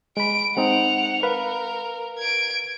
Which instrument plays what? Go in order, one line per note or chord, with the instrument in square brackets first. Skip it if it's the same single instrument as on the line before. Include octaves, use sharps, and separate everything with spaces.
[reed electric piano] G#3 B5 [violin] D7
[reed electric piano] G#3 C4 D#4 [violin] F#5 F7
[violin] A#4 [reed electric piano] B4 F5
[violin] G#6 D7